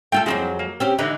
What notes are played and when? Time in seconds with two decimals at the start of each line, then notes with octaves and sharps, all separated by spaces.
0.12 A3 F4 A4 G5
0.26 F2 F#3 A#3 C4 E4 G#4
0.59 A#3
0.80 C4 C#4 G4
0.99 D3 E3 G#3 D#4 E4